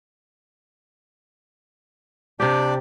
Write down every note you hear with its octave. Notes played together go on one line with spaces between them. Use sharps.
C3 D4 G4 D5